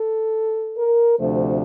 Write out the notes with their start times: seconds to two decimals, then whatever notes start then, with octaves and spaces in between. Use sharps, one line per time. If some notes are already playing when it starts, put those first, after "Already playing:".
Already playing: A4
0.77 A#4
1.19 D2 C3 F3 A3 D4 C5